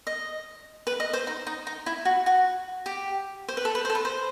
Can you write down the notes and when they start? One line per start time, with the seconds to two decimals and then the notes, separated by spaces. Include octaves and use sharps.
0.07 D#5
0.87 B4
1.00 D#5
1.13 C5
1.27 D#4
1.47 D#4
1.67 D#4
1.86 E4
2.05 F#4
2.26 F#4
2.86 G4
3.48 C5
3.57 B4
3.65 A4
3.75 B4
3.85 C5
3.90 A4
3.95 B4
4.05 C5